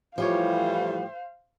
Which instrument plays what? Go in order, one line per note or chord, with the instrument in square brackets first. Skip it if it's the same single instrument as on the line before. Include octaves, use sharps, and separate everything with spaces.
[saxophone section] A2 E3 G3 [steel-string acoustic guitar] F3 G4 C#5 [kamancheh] C5 F5